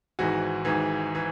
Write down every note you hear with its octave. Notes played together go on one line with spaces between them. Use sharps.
G#1 G#2 E3 F#4
G#1 G#2 E3
E3